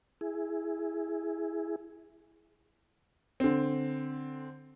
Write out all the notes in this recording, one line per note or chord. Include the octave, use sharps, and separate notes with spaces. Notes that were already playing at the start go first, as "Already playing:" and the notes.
E4 G#4
D3 C4